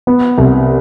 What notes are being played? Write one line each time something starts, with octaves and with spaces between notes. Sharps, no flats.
B3
C2